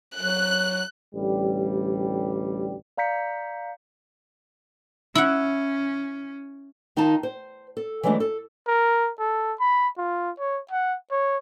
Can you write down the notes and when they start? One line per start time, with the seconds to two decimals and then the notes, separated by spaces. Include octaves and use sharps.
0.20 F#3 F#6
1.14 A1 D2 G3
2.97 D5 F5 A#5 G6 B6 C#7
5.15 C#4 E4 F#5
6.96 D#3 D#4 F4 F5 A5
7.23 C5
7.77 A4
8.03 E3 F#3 G#3 A3 D4
8.20 A4
8.67 A#4
9.20 A4
9.60 B5
9.98 F4
10.40 C#5
10.71 F#5
11.11 C#5